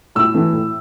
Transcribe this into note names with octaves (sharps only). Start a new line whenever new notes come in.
A2 E6
E3 A3
A2